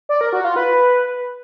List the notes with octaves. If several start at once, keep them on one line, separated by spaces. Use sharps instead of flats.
D5
A#4
F#4
F4
B4